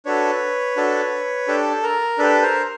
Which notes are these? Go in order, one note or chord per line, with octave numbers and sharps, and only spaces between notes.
D4 F#4 A4 B4 C#5
D4 F#4 A4
D4 G4 A4
A#4
D4 G4 A4 B4
A#4 C5